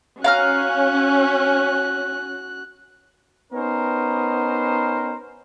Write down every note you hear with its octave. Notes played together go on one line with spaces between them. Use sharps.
C#4 F#4 F5 A#5 F6 F#6
B3 C#4 D#4 A#4 C5